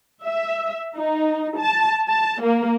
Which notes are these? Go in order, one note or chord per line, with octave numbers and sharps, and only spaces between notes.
E5
D#4
A5
A5
A#3